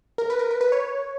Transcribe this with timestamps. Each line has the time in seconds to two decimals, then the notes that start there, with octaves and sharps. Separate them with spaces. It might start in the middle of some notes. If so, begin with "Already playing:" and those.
0.18 A#4
0.30 B4
0.39 A#4
0.51 B4
0.61 B4
0.72 C#5